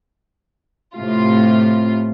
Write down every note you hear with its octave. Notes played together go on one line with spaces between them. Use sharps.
A2 C3 F4